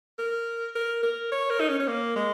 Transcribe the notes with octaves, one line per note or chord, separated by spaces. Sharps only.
A#4
A#4
A#4
C#5
A#4
D#4
C#4
C#4
A#3
G#3